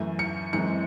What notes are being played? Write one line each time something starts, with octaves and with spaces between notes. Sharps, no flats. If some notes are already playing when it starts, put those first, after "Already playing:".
Already playing: F#2 E3 A3
C#7
F#2 E3 G#3 C4 C#7